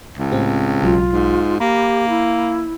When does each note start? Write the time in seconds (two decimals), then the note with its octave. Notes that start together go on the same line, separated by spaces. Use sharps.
0.18 C#2
0.32 A2 C4 G4
0.82 B1 F#3 F4
1.13 G#2
1.60 A#3 G4 B5
2.09 E4